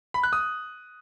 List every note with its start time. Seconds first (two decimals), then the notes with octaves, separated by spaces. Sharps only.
0.14 B5
0.23 F#6
0.33 D#6